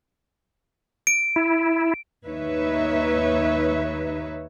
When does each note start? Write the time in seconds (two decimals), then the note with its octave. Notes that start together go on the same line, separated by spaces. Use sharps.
1.07 D7
1.36 E4
2.26 D#2 D#4 B4 C#5 E5